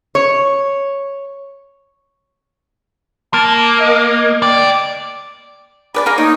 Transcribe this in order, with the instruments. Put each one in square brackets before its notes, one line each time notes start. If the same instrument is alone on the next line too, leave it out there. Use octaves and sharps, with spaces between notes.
[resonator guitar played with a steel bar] C#5
[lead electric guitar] A#3 [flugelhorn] A5
[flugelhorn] D#5
[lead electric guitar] D2 D5 [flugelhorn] G5
[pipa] G#4 B4 D5 [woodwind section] B5 D6
[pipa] A#3 G#4 A#4
[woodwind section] A#3 D#4 [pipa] C#5